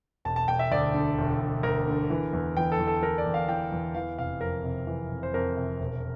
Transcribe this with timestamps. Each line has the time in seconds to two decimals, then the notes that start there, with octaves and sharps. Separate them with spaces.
0.25 E1 A5
0.36 A5
0.48 E1 G5
0.59 E5
0.72 D2 D5
0.94 D3
1.18 E1
1.40 E1
1.63 D2 A#4
1.88 D3
2.10 E3
2.33 E2
2.57 E3 G5
2.72 A4
2.79 E2
2.88 A4
3.02 E3 A#4
3.18 D5
3.26 E2
3.34 F5
3.48 E3 G5
3.72 E2
3.94 E3 F5
4.18 F1 F5
4.41 F2 A#4
4.64 C3
4.87 E3
5.11 F1
5.23 C5
5.33 F2 A#4
5.57 C3
5.80 E1